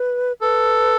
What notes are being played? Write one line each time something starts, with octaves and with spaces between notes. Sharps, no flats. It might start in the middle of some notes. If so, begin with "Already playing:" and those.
Already playing: B4
A4 B4